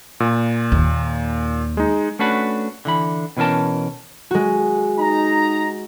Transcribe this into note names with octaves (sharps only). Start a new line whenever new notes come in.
A#2
D#2
G#3 D#4
A3 C#4 D4 F#4 B4
D3 E3 B5
B2 E3 C#4 A#4 A5
G#3 F#4
D#4 A#5